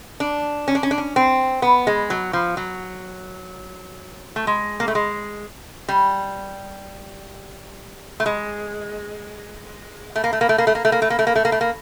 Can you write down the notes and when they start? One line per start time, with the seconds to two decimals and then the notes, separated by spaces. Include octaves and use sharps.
0.20 D4
0.68 C#4
0.75 D4
0.83 C#4
0.91 D4
0.98 C#4
1.16 C4
1.62 B3
1.87 G#3
2.10 F#3
2.33 F3
2.57 F#3
4.36 A3
4.47 G#3
4.80 A#3
4.88 A3
4.95 G#3
5.89 G3
8.20 A3
8.26 G#3
10.16 A3
10.24 A#3
10.33 A3
10.41 A#3
10.49 A3
10.58 A#3
10.67 A3
10.75 A#3
10.85 A3
10.92 A#3
11.02 A3
11.10 A#3
11.19 A3
11.27 A#3
11.36 A3
11.45 A#3
11.52 A3
11.61 A#3